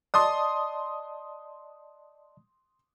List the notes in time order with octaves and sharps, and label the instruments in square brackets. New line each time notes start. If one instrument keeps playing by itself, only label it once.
[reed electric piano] D5 D#5 A5 [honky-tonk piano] C6 D#6